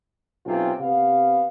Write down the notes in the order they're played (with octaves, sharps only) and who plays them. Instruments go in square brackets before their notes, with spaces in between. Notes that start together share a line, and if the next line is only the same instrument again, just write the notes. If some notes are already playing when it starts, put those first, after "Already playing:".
[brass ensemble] B1 C3 C#4 F4 G5
C3 B3 F5